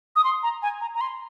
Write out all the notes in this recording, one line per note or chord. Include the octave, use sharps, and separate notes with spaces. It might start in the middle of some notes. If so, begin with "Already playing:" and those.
D#6
C6
A#5
G#5
A#5
A#5
C6